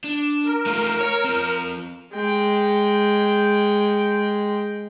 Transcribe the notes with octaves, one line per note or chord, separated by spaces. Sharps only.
D4
A#4
A3 D#4 F4
C#5
C4 F4
G#3 G5